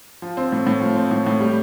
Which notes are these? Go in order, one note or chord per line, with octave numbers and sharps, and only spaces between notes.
F3
C4
A2
A2
F3
C4
A2
A2
G3